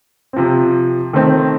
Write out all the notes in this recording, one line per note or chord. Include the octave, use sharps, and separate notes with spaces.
C3 F3 C4
D#3 A3 C4